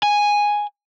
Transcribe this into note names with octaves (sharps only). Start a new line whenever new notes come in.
G#5